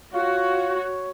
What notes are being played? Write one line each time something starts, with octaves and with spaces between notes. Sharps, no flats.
F4 F#4 C#5